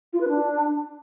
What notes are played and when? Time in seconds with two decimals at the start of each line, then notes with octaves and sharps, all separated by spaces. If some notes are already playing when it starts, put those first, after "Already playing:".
0.13 F4
0.21 B4
0.28 D4